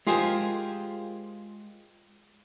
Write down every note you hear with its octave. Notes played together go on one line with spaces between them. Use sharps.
G#3 F4 G4 G#4 A#4 C5